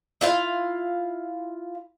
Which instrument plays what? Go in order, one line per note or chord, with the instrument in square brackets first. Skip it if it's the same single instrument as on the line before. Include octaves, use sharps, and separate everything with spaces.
[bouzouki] E4 F4 F5